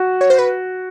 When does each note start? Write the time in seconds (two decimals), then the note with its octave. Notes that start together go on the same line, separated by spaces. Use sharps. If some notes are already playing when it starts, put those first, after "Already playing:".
Already playing: F#4
0.21 C#5
0.30 C5
0.39 B4